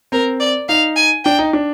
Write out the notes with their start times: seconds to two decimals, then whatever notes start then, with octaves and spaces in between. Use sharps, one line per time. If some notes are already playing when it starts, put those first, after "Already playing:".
0.12 C4 A#4
0.40 D5
0.69 D#4 F5
0.96 G#5
1.25 D4 G5
1.39 D#4
1.53 D4